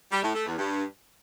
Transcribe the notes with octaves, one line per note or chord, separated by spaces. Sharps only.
G3
A2
A3
E2
G2